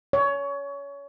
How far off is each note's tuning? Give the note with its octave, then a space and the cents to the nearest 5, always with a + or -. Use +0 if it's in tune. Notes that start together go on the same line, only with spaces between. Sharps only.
C#5 +25